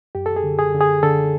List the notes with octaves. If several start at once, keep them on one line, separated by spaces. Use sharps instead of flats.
F#2 G4
A4
G#4
D3
G#4
D3
G#4
D3 A4